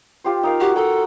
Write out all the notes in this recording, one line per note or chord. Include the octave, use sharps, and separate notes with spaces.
F4 G4 C5
D#4 A#4 F5
F#4 G4
A4 A#5